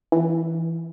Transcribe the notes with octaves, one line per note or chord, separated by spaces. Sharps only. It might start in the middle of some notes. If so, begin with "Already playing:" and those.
E3